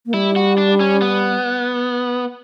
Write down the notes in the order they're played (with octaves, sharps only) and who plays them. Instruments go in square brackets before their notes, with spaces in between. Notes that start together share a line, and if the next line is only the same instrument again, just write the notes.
[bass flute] A#3
[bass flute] G3 [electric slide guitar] E4
[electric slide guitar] F#4
D4
C#4
B3